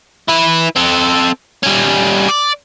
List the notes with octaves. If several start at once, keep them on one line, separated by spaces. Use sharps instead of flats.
E4 B4
C4 A4
G3 C#4
D5